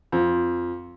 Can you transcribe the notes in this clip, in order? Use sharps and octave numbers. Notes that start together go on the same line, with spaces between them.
F2